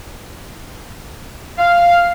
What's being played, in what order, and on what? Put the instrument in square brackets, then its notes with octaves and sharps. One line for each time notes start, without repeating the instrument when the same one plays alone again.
[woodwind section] F5